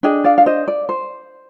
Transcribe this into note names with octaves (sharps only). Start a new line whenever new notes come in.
D4 G#4 D#5 G5
D5 F5
F5
C5 D#5
D5
C5